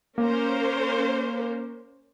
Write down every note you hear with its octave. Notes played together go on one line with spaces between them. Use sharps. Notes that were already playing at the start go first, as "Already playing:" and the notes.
A#3 C#4 A#4 C5